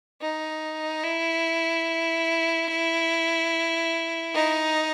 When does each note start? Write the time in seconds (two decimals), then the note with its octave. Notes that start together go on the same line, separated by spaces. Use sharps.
0.21 D#4
1.03 E4
4.33 D#4